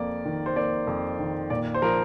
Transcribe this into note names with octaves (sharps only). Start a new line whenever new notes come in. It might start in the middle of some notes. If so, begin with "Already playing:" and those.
Already playing: F2 A#3 D5
D#3
C5
A#3 D5
F2
D#3
A#2 D5
C5
F3 A#4